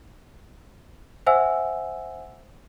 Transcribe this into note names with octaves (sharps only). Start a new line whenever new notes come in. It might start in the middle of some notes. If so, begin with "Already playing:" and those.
C5 E5 F#5 G#5 E6